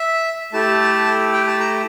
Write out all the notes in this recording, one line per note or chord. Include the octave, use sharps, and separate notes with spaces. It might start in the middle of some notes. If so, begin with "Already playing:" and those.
Already playing: E5
A3 E4 G4 A5
G5
A5
A#5